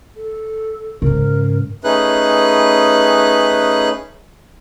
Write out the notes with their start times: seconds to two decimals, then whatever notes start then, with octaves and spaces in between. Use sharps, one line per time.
0.17 A4
1.02 G#2 C#3 A#4
1.84 A3 C#4 D#4 G#4 B4 F#6